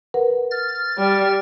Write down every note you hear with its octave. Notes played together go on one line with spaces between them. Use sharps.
A#4 B4 F#5
F6 A6
G3